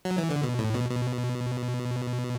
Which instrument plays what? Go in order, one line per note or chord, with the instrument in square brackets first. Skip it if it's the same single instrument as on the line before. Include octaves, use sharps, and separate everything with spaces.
[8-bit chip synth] F#3
E3
D3
B2
A2
B2
B2